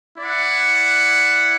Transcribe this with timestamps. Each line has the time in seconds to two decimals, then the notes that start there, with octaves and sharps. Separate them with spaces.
0.17 E4 D5 F#5